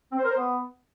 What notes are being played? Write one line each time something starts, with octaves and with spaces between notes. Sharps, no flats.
C4
C5
A#4
C5
B3